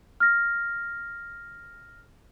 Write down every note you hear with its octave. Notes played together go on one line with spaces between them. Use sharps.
F6 A#6